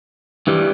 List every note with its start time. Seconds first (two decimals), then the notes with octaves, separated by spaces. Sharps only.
0.47 G2 E3 G3